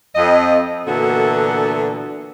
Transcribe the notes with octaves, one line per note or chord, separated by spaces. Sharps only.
F2 D#5
A#2 D3 E3 B3 F#4 A4